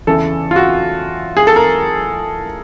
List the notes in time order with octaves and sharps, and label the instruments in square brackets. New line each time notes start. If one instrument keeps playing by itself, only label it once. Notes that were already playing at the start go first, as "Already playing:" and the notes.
[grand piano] E2 C#3 E3 A4
F4
F#4
G#4
A4
A#4